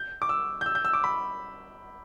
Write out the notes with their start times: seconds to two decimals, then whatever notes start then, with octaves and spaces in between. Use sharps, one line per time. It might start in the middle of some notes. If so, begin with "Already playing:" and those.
Already playing: G6
0.22 D6
0.29 E6
0.61 G6
0.66 E6
0.75 G6
0.85 E6
0.93 D6
1.04 B5